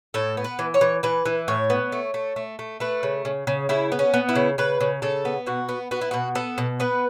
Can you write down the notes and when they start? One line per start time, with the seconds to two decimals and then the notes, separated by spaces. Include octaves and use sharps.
0.14 A2 A4
0.37 B3
0.44 B4
0.59 E3
0.74 C#5
0.81 E3
1.03 E3 B4
1.26 E3
1.48 A2 C#5
1.70 B3
1.92 A3
2.14 A3
2.36 A3
2.59 A3
2.80 A3 B4
3.03 C#3
3.25 C#3
3.47 C#3
3.69 C#3 E4
3.92 B3
3.99 C#4
4.14 B3
4.29 E4
4.35 C#3
4.58 C#3 B4
4.81 C#3
5.02 C#3 A4
5.25 B3
5.46 B2 F#4
5.69 B3
5.91 B3 F#4
6.01 E4
6.11 B2 F#4
6.35 B3 A4
6.58 B2
6.80 B3 B4